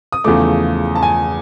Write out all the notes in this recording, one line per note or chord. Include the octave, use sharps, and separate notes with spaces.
D#6
E2 C#3 F3 A3 D6
A5
G#5